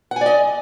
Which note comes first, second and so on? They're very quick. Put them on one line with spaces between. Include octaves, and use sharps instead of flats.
F#5 G#5 D5 D#5